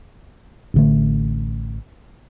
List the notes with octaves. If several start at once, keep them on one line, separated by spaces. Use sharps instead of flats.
A1 D3 A3